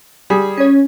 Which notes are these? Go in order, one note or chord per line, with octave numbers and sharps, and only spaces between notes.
G3 G#4
C#4 C#5